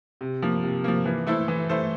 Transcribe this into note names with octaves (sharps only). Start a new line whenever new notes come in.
C3
F3 A#3
C3
F3 A#3
E3
A3 E4 A4 C5
E3
A3 E4 A4 C5